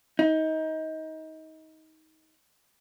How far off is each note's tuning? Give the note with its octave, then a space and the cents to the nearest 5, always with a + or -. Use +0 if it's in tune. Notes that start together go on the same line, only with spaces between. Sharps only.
D#4 +25